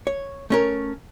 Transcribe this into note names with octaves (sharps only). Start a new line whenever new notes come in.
C#5
A3 C#4 A#4